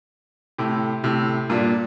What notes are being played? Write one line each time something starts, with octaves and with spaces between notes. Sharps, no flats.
A2 C3
A2 C3
G2 A#2